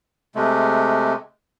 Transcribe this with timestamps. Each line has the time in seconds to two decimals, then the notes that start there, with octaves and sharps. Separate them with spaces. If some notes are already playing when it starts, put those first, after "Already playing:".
0.35 C3 G#3 A3